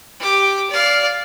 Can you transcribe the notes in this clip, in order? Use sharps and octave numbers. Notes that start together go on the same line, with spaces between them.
G4 D6
D5 F5